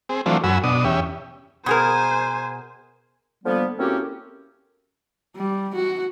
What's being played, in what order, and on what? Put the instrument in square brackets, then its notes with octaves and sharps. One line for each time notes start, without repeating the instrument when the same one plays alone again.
[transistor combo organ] C4 G#4
E3 F#3 A3 C4 D4 F4
F#2 F#4 G#5 B5 E6
B2 D4 D#6
E2 C#4 G4 E5
[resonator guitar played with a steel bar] B2 G#4 A#4 [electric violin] C5 G#5
[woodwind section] D3 F3 G3 A#3 B3
A2 A#3 C4 C#4 F#4 G4
[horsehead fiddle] G3
F#4